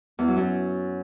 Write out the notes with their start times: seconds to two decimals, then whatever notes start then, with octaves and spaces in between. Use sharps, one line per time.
0.19 E2
0.28 F#3
0.37 F#2